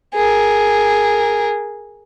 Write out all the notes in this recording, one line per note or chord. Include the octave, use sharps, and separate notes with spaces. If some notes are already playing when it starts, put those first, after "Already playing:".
G#4 A#4